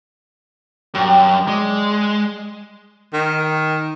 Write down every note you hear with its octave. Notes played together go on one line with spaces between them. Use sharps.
F#2 G3 G4
G#3 D5
D#3